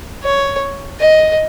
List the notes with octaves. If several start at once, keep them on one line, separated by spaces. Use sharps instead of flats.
C#5
D#5